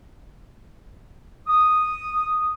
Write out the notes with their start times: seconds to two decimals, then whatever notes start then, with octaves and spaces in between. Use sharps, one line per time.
1.48 D#6